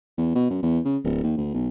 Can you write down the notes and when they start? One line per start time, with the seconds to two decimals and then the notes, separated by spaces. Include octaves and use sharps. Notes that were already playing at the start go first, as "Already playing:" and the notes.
0.18 E2
0.35 B2
0.50 F#2
0.63 E2
0.85 C#3
1.04 D1
1.23 D#2
1.37 D2
1.54 B1